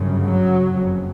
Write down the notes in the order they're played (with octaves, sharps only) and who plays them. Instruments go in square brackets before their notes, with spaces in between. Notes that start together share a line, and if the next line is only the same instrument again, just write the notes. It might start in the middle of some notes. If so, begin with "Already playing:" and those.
Already playing: [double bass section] G1 F#2 C#3
F#3
F#1 F2 C#3